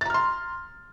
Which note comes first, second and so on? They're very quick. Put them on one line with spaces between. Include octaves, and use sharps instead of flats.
A6 A#5 F6 C6